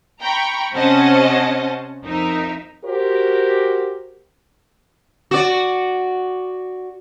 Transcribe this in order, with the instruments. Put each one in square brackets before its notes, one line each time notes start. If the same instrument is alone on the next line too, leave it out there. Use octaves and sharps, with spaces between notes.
[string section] G5 A#5 B5 C#6
C3 C#4 C5 D#5 F#5 A5
F2 D#4 A#4 E5
[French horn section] F#4 G4 A#4 C5
[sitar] F#4 D5